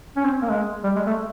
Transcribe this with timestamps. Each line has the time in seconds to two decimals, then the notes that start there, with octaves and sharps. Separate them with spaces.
0.16 C#4
0.24 C4
0.42 A#3
0.50 G#3
0.84 G3
0.96 G#3
1.06 A3